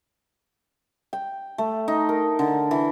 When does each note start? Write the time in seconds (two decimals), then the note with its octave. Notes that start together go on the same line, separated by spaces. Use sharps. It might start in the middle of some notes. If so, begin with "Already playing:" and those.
1.13 G5
1.58 A3
1.88 D#4
2.09 A#4
2.39 D3
2.71 E3